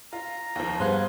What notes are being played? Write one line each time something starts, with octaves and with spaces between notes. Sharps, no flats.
F4 A#5
D#2 F3
G2 G3 B3 G#4 C5 F5 F#5 F#6